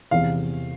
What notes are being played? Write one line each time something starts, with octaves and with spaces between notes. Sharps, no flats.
E2 C3 E3 F5